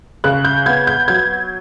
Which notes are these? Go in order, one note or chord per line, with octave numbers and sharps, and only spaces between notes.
C#3 F#6
G6
B3 G#6
G6
F#3 G#6